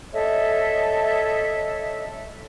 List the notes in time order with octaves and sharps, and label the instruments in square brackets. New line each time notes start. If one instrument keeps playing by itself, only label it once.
[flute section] A4 C#5 D#5 E5